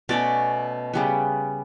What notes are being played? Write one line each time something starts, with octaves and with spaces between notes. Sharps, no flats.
B2 A3 C#4 D5
C#3 G3 B3